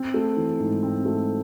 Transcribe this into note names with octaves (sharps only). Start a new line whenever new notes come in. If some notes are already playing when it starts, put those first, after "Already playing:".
Already playing: C4
A3
E3
G#2
C4
A3